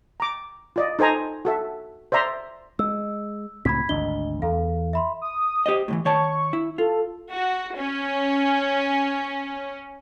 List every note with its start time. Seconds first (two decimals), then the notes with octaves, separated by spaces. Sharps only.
0.20 A#5 D6
0.76 F4 D5 D#5
0.99 D#4 A4 C5 G#5 A#5
1.45 F#4 A4 E5
2.12 C5 D5 E5 A#5 C6
2.79 G#3 E6
3.65 C#2 A2 C4 B5 G#6 B6
3.89 G#1 D2 D4 D#5 G7
4.42 E2 A4 F5
4.93 E5 B5 C6
5.22 D#6
5.66 G4 C5 D#5
5.88 A2 C3 E3
6.05 D#3 C#5 A5 C#6
6.53 E4
6.78 F4 A4
7.32 F#4
7.77 C#4